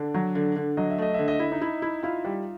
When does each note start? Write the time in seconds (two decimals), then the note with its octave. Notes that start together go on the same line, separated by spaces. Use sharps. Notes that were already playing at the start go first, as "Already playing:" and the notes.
Already playing: D3 D4 D5
0.14 F#3
0.35 D3
0.56 D3
0.77 F#3 D#5
0.90 E5
0.98 A3 D#5
1.14 D3 E5
1.28 D#5
1.39 E4 E5
1.52 D#4 D#5
1.61 E4
1.82 E4
2.03 E4 F4 F5
2.25 G3